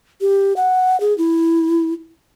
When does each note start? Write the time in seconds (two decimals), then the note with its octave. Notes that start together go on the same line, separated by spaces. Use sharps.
0.21 G4
0.57 F#5
1.00 G#4
1.18 E4